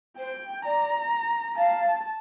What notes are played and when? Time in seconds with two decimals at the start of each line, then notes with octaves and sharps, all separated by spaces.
0.18 C5 G5
0.65 D5 A#5
1.57 F5 A5